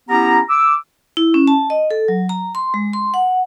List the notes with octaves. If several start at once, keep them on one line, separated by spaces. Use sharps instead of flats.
B3 C#4 E4 G4 A#5
D6 E6
E4
C#4
A5
D#5
A4
F#3
A#5
C6
G#3
C6
F#5